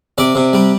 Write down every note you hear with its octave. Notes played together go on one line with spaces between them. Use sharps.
C3 D5
C3
G3